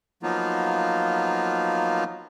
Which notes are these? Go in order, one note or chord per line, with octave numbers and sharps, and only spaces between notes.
F3 F#3 A#3 B3 D#4 F4